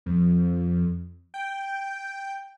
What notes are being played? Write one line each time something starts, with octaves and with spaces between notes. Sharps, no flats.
F2
G5